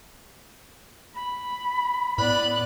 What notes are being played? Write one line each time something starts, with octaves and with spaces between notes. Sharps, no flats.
B5
A2 B3 D5 B5 F#6